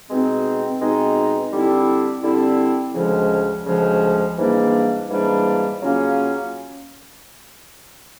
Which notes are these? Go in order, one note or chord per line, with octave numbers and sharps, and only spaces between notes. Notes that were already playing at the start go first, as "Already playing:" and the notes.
B2 G#3 C4 D#4
B2 G#3 C4 D#4
D3 G3 C4 E4
D3 G3 C4 E4
D2 C#3 F3 G#3 C#4
D2 C#3 F3 G#3 C#4
G#2 E3 G3 A#3 D4
G#2 E3 G3 A#3 D4
C#3 F#3 A#3 C#4 F4